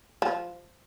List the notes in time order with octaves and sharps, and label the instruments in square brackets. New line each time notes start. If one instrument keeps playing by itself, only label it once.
[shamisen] F3